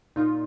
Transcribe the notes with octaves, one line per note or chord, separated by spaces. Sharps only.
A#2 D#4 F4